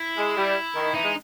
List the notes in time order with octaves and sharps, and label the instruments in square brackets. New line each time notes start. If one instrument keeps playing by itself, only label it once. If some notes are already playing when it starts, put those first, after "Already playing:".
Already playing: [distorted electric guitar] E4
[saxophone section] G#3
G3
D#3
[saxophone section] E3 [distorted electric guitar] D#4
[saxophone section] G#3